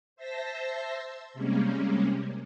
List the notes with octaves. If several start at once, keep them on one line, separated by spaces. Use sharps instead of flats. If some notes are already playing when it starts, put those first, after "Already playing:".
C5 E5 A5 C6 E6 A#6
C3 G3 G#3 A#3 C#4